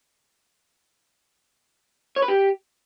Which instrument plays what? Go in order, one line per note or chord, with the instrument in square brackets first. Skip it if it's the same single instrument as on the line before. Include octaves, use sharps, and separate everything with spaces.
[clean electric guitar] C#5
B4
G4